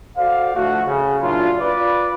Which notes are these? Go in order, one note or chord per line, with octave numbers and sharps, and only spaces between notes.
F#4 A4 C5 D5 F5
D2 A2 F3 A3 F#4
C#3
A#2 F#3 D4 E4 F4
F4 B4 D5